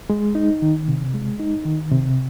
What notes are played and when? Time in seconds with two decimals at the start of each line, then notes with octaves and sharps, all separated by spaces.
0.10 G#3
0.35 D#4
0.62 D#3
0.88 C3
1.14 G#3
1.39 D#4
1.65 D#3
1.91 C3